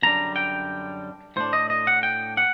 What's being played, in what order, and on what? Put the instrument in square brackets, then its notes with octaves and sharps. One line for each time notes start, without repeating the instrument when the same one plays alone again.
[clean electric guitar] F#2 D3 G3 D4 A#5
G5
A2 A3 D4 C5
D#5
D#5
F#5
G5
F#5